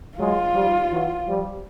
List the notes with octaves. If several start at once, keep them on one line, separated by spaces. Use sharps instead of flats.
F#3 G#3 F4
F3 G3
E3 F#3
F3 G3